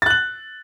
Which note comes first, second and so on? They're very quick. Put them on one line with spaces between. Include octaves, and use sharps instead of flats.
A6 F#6 F#7